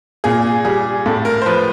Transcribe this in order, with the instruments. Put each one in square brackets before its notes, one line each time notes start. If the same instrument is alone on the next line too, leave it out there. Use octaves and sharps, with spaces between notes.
[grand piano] A#2 G#4
G3 G#4
A2 A4
A#4
C5
F3 B4